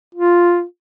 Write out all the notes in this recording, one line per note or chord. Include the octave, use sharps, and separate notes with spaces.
F4